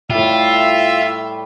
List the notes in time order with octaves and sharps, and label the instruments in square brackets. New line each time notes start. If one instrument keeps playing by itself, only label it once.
[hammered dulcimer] A2 G3 [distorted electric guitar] F4 [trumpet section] E5